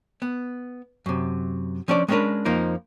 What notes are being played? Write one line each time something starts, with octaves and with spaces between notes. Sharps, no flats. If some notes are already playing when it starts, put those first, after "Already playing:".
B3
F#2 C3
F3 C#4 D4 D5
G#3 B3 C#4 D4 A#4 B4
F2 F3 A#3 D#4 A#4